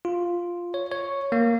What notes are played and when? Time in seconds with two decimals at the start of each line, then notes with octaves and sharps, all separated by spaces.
0.05 F4
0.74 C#5
0.92 C#5
1.32 A#3